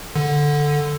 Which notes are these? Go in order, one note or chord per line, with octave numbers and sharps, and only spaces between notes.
D3